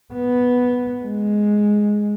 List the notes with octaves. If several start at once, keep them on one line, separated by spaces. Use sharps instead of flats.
B3
G#3